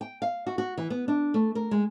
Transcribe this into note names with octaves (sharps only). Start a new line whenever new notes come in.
G5
F5
F#4
F#4
E3
B3
D4
A3
A#4
G#3